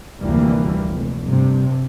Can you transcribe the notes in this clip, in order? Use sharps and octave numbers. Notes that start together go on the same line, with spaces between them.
F1 D2 E3 G3 A#3
F1
G2 C3